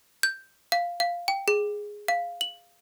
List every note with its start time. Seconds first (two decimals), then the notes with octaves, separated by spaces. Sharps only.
0.23 G6
0.72 F5
1.00 F5
1.28 G5
1.48 G#4
2.08 F5
2.41 F#7